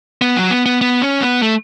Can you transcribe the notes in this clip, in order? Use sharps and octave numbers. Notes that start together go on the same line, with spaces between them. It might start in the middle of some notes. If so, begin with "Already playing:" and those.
B3
F#3
B3
B3
B3
C#4
B3
A3